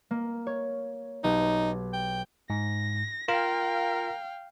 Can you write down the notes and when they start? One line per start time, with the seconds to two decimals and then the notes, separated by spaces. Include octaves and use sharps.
0.11 A#3
0.47 C#5
1.24 B1 D#4 G4
1.93 G5
2.50 G#2 A#6
3.28 F4 A#4 F5 G5